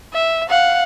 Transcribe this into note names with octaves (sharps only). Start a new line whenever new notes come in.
E5
F5 F#5